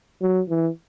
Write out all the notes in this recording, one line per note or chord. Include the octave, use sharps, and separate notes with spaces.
F#3
E3